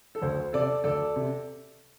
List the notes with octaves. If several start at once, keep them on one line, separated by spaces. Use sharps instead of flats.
A4
D2 C5
C3 A4 D5
D2 A4 D5
C3